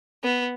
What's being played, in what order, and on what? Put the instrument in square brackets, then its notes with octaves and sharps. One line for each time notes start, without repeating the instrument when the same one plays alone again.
[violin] B3